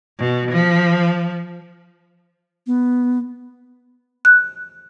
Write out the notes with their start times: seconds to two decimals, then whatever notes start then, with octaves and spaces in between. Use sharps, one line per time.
0.19 B2
0.51 F3
2.67 B3
4.25 F#6